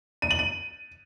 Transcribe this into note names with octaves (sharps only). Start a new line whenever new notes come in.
D#7
F#7
D#7